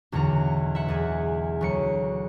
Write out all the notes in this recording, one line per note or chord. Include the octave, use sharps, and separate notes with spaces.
B1 E2 D3 F#5 A#5
E5 F#5
E2 G#4
D2 F#3 C#7